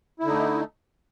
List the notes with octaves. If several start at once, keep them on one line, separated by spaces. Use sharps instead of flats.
D3 A3 D#4 E4